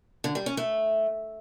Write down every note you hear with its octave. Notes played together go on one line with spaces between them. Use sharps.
D3
G3
C#4
A3